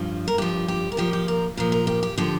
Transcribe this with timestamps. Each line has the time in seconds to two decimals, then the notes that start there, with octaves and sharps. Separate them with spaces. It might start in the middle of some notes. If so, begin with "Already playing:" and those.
Already playing: G2 F3
0.28 A#4
0.38 G2 F3 G4
0.68 G4
0.92 A#4
0.97 A#2 F3 G4
1.13 G4
1.28 A#4
1.57 A#2 F3 A#4
1.72 A#4
1.87 G4
2.03 G4
2.18 D3 F3 G4